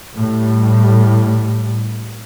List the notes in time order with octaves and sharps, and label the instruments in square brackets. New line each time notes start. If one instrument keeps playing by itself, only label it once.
[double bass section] A2 G3